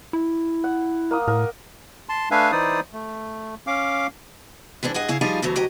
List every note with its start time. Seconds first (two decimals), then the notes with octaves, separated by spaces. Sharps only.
0.13 E4
0.64 F#5
1.11 A#3 D#6
1.28 A2 A#4
2.09 A5 C6
2.31 A3 D4 B4 E5 F5 G#5
2.52 E3 D#4 E4 C5 D5 D#6
2.93 A3
3.67 C#4 F5 D6
4.83 E3 G#3 C4 D4
4.94 G2 G#4 D#5 F#5
5.08 C#3 E4 G#4 F5
5.21 F3 G3 D#4 F4 G#4
5.42 D2 B2 E3 F#3 A3
5.56 D2 F#3 G4 D#5